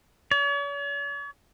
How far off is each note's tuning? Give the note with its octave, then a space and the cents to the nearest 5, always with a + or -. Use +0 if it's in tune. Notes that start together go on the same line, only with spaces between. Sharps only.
C#5 +45